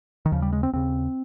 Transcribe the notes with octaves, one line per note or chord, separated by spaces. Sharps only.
D#3
D#2 C#3 F3
G3
G#3
C4
D#2 C#3 C4